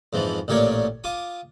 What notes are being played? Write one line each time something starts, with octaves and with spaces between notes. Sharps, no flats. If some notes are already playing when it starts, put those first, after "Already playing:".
F2 G#2 E3 F3
A1 A#2 G4 A#4 C#5 D5
F4 D6 D#6